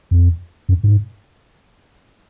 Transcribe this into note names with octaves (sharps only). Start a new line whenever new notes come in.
F2
F#2
G#2